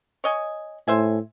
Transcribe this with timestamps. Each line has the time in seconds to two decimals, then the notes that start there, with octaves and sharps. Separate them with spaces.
0.24 C#5 D#5 G#5
0.88 A2 C5 E5 G#5